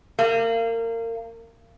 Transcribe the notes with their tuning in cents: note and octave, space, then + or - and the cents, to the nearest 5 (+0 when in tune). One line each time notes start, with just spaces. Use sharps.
A#3 -30